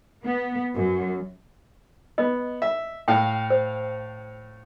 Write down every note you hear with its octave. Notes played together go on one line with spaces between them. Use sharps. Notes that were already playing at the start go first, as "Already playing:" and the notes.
B3
F#2
B3 D#5
E5
A2 F5 G5
C5